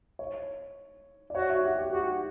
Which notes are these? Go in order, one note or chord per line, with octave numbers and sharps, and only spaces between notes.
C#5
D5
F#4 C#5
E5
G4
G4
F#4 G4